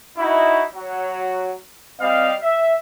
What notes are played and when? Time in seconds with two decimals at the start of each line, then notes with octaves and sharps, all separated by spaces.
0.18 D#4 E4 F#4
0.73 F#3
2.00 G3 C4 D#5 F5
2.43 E5